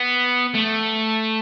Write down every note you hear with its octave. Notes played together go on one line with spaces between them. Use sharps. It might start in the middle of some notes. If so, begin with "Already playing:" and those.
Already playing: B3
A3